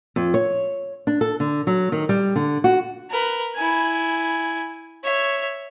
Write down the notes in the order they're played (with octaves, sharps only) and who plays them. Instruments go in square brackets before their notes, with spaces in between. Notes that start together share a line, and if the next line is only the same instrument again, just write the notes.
[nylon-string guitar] F2
C#5
D4
A4
D3
F#3
D#3
G3
D3
F#4
[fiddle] A#4 B4
E4 G#5
C#5 E5